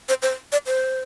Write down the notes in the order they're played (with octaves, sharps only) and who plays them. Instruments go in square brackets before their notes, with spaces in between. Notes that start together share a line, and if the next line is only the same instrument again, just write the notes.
[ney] C5
C5
D5
C5